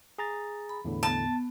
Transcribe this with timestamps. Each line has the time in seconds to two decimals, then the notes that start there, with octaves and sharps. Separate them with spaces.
0.18 G#4 A#5 A6
0.69 B5
0.85 E2 A2 D3
1.03 B3 A5